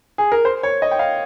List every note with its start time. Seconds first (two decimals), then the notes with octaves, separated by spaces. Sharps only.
0.18 G#4
0.32 A#4
0.45 C5
0.63 C#5
0.82 D#5
0.91 G5
0.99 F5